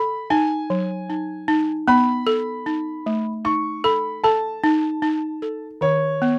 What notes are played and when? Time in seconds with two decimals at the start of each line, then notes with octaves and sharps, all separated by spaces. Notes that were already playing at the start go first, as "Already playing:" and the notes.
Already playing: A4 B5
0.30 D#4 G#5
0.70 F#3
1.10 D#4
1.48 D#4
1.88 B3 B5
2.27 A4
2.66 D#4
3.06 A3
3.45 D#4 C#6
3.84 A4 B5
4.24 A4 A5
4.64 D#4
5.02 D#4
5.42 A4
5.81 D#3 C#5
6.22 B3